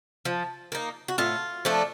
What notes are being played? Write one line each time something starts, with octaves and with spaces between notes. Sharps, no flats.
F3
A#3 D#4
F#4
A2 F4
F3 A3 D4